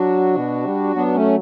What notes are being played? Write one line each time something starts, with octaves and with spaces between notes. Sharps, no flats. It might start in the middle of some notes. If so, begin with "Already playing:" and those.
Already playing: F#3 D4 F#4
B2
G3
F#3 B3 D4
A3 C#4